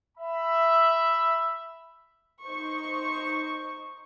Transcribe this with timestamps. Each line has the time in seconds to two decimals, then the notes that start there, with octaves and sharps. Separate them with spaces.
0.18 E5 B5
2.45 D#4 C5 C#6